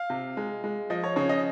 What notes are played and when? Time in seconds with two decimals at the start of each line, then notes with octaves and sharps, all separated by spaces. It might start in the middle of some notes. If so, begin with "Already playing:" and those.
Already playing: F5
0.10 C3
0.37 G#3
0.64 G#3
0.90 F3 D#5
1.04 C#5
1.16 C#3 C#5
1.29 D#5